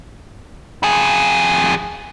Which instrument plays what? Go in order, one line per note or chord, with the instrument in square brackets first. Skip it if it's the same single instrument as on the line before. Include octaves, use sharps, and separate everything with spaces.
[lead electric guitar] F2 G#4